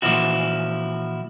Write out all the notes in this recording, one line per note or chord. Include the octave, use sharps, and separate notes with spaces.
A#2 E3 F3 E4 F#4